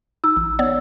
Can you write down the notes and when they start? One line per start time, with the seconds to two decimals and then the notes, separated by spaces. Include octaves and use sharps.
0.24 D#4 E6
0.37 A1
0.59 B3 C#5 D5